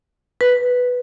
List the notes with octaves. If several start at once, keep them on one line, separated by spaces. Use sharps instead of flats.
B4